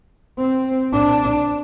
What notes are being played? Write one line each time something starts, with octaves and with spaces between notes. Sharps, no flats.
C4
D4